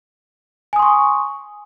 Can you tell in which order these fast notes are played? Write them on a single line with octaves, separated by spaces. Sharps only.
G#5 D#6 C6 C#6